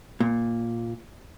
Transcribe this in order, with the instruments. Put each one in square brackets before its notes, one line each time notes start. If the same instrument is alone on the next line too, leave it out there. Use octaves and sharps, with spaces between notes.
[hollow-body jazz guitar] A#2